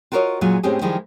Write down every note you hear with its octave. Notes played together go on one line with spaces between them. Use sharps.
F4 F#4 A#4 B4 C#5 D#5
A#2 F#3 G#3 F4
A2 G#3 C4 C#4 G4 G#4
D#3 F3 G3 G#3 E4